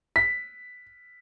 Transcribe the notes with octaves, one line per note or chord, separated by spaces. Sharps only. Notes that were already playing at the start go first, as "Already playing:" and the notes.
B6